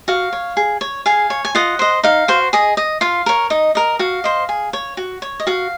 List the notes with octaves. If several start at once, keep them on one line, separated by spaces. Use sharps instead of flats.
F#4 F5
C#5
G#4
C#5
G#4 F5 G#5
C#5
G#5
F4 D#5 F#5
C5 D#5
D#4 F5
F#4 C5
G#4 D#5
D#5
F4 F5
A#4 C#5
D#4 D#5
A#4 D#5
F#4 F5
C5 D#5
G#4
C#5
F#4
C#5
D#5
F#4 F5